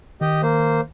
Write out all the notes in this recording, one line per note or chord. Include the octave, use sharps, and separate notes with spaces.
D#3 G4 D#5
A#3 C5